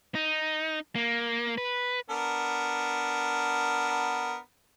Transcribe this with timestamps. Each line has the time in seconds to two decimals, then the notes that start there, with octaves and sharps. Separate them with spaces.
0.15 D#4
0.95 A#3
1.58 B4
2.10 B3 D4 A#4